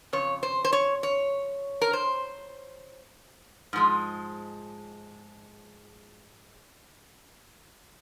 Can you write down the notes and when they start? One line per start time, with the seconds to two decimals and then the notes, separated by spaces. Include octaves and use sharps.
0.13 F2 C#3 C#5
0.43 C5
0.65 C5
0.73 C#5
1.03 C#5
1.82 A#4
1.93 C5
3.73 G#2 F3 G#3